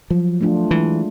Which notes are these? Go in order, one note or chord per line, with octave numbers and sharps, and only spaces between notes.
F3 F#3
A3 D4 F4
E3 G#3